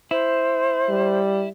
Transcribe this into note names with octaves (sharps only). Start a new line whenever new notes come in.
E4 C5
G3